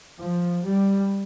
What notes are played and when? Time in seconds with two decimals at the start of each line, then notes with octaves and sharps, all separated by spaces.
0.22 F3
0.65 G3